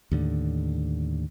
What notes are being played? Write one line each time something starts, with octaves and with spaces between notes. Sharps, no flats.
D#2 A2 D3